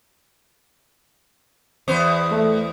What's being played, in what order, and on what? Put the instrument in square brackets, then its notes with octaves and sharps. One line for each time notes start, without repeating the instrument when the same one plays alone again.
[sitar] E2 B3 C5
[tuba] A3